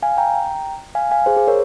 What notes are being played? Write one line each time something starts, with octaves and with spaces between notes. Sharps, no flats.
F5 G#5
G5 A#5
F5 G#5
F5 G#5
G#4 C5
G#4 C5
A#4 C#5